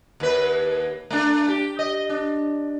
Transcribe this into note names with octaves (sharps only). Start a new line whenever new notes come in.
D#2 B4
A3 D4
G4
D#5
D4